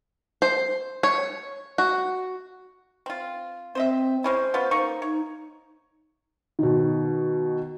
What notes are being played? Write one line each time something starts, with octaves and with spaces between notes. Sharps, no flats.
C5
C#5
F#4
C4 F4
C4 C5 D#5 E5
G#3 C#4 E4 C5
B3 C#4 F4
A#3 D#4 C#6
D#4 C#5
B2 D#3